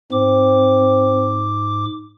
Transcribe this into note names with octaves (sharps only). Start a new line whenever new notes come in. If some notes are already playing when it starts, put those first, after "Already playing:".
G#2 C4 D6